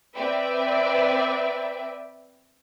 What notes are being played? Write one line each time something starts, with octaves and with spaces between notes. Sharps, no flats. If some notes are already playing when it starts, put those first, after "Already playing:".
C4 B4 D5 E5 G5